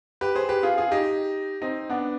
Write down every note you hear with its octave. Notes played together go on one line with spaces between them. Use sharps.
G4 B4
G#4 C5
G4 B4
F4 G#4
F4 G#4
D#4 G4
C4 D#4
B3 D4